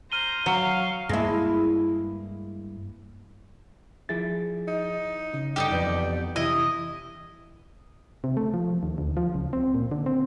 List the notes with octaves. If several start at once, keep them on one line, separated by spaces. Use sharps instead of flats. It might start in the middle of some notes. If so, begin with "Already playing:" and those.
C5 A#5 F6 D#7 G7
F#3 F5 C#6
G2 G#3 A#3 E4
F3 E4 G#4 A6
D#4
C#3 D#5
G2 D3 D#4 E4 G4
F2 B2 E3 B3 B4 D5 G6
C3 E3 D4 E4 G4 D#5
C3
A3
F3
D#2
D2
F3
C#2
C4
A#2
D3
C4